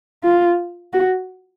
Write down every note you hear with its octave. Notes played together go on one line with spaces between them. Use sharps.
F4
F#4